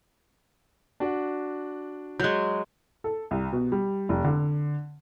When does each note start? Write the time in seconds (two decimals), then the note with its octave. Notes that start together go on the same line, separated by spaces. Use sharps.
1.00 D4 F#4
2.20 F#3 G#3 F#6 G6
3.04 A4
3.31 C2
3.52 B2
3.72 G3
4.09 F1
4.24 D3